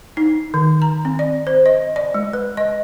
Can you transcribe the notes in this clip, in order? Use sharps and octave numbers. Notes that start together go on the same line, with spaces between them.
D#4
D#3
A#5
C4
D5
C5
D#5
D5
G#3
B4
D#5